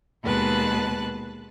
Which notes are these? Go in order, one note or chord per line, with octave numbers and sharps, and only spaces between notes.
D#2 B2 G#3 B4 A5 F#6